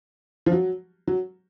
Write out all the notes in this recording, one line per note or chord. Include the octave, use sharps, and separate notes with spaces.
F3
F#3
F#3